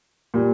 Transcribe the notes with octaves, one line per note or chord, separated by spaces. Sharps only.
A#2 G3